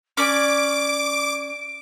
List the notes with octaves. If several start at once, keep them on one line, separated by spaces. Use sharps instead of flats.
C#4 D5 G#5 D6 D7